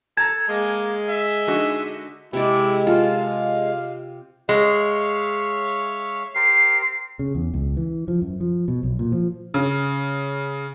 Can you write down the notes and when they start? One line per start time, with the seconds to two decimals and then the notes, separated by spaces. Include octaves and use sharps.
0.17 A4 A5 A#5 G#6
0.49 G#3 A#3
1.09 E5
1.47 D3 D#4 F#4
2.33 C3 G#3 E4 D5
2.87 F4 A4 F5
4.49 G#3 C#5 E5 F5
6.35 C4 G4 A#4 C7
7.19 C#3
7.35 E2
7.54 C#2
7.77 E3
8.08 F3
8.22 F#2
8.40 F3
8.68 B2
8.83 B1
8.99 A#2
9.12 F3
9.54 C#3